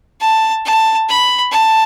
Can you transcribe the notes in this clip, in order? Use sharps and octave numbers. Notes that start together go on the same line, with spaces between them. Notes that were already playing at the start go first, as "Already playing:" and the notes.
A5
A5
B5
A5